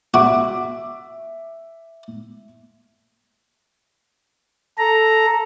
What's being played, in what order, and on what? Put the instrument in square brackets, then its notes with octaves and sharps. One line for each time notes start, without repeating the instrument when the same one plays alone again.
[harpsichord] F#4 [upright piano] E5 D6
[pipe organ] A4 A#5